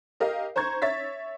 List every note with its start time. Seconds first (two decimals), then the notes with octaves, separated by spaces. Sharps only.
0.20 G4 A#4 D#5 F5
0.56 C5 A#5 C#6 G#6
0.82 C#5 E5 A6 B6